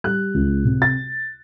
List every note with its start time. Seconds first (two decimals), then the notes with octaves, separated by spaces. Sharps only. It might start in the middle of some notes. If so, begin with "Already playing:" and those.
0.04 G3 F#6
0.34 C#2
0.65 C3
0.82 A6